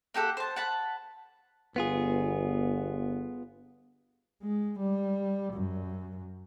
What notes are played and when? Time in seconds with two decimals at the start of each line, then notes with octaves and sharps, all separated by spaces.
0.14 A#3 G4 A4 F#5
0.37 C5 A5
0.56 F#5 A5 B5
1.76 G1 B3 F4 G#4
4.43 G#3
4.79 G3
5.53 F#2